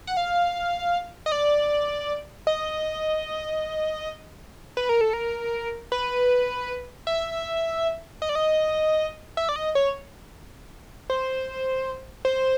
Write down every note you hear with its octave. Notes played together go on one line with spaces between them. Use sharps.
F#5
F5
D#5
D5
D#5
B4
A#4
A4
A#4
B4
E5
D#5
D5
D#5
E5
D5
D#5
C#5
C5
C5